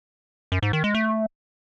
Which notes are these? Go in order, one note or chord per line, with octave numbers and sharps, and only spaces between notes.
F#2
G#2
D#3
G#3
A3